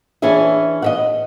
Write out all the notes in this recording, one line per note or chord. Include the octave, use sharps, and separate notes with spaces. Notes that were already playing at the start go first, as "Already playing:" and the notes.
E3 C#4 D4 G#4 E5
D#5 E5 F#5